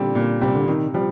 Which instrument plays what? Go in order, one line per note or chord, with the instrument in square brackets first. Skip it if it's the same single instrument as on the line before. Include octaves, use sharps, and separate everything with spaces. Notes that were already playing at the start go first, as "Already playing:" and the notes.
Already playing: [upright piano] A#2 G3 C4 [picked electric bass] D3
[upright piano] A#2
[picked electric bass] C3 [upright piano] G3 C4
[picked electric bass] D3
[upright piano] C3 [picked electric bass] D#3
[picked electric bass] F3 [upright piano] G3